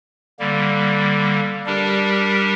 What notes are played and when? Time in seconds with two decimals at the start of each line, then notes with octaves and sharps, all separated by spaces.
0.39 D3 G3 A#3
1.66 G3 D4 G4 A#4